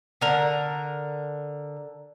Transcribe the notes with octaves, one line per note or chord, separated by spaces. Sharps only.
D3 A#4